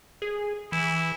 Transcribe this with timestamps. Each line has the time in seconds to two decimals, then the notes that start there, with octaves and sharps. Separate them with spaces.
0.22 G#4
0.72 E3 E4